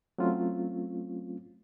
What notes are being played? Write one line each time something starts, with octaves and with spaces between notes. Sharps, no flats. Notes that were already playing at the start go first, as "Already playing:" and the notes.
F#3 A3 C4 C#4 F4